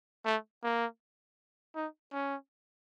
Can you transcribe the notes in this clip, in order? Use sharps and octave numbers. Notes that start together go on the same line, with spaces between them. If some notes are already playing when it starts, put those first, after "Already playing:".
A3
A#3
D#4
C#4